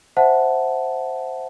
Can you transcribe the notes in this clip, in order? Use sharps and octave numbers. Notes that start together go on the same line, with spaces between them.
C5 E5 F#5 A5